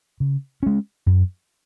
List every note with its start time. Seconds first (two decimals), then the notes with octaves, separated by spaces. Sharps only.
0.20 C#3
0.63 G#3 C#4
1.06 F#2